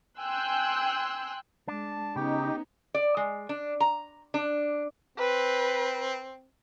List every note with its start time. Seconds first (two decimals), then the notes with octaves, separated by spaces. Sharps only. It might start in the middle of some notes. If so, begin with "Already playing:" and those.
0.20 G5 G#5 C6 E6 F#6 G6
1.68 G#3 D4 A5
2.16 C#3 B3 C#4 D#4 G4 G5
2.94 D5
3.17 G#3
3.49 D4
3.80 A#5
4.34 D4
5.18 C4 B4